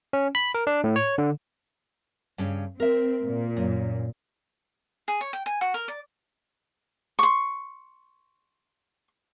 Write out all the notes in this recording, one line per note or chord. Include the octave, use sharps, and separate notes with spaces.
C#4
B5
A#4
D4
A2
C#5
D3
G2 C#3 C#4
C4 A#4 E5
A#2
F#2
G#4
C#5
G5
G#5
F#4
A#4
D5
C6 C#6